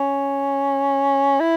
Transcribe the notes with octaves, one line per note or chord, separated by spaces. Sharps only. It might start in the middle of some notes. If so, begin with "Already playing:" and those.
Already playing: C#4
E4